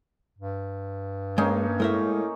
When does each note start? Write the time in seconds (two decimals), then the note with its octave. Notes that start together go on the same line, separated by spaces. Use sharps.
0.39 G2
1.38 G#3 A#3 C#4 D#4
1.80 A2 G#3 A#4 E5